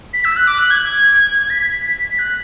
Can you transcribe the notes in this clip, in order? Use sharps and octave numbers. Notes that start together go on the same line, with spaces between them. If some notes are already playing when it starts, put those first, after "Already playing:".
B6
E6
F#6
D6
F#6
G#6
B6
F#6